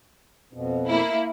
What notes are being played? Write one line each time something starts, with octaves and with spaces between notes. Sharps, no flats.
F2 B2
A#3 E4